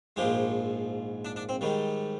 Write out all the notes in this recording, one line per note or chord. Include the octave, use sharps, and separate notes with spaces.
A#1 G#2 F3 G#3 G4
D4
D4
C4
G#2 D#3 G3